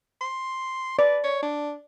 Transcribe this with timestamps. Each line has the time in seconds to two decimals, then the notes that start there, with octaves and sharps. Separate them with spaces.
0.21 C6
0.99 B4 D5
1.24 C#5
1.43 D4